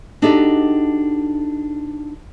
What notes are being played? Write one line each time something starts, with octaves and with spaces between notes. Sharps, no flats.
D4 D#4 F#4 G4 A4 E5